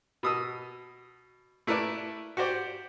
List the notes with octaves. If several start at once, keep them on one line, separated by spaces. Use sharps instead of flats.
B2 D#6 E6
A3 E4 A#4 B4 D5
F#4 G4 C5 D5